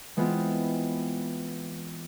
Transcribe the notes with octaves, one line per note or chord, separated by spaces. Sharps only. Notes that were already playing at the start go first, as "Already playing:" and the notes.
E3 G#3 B3 C4 F4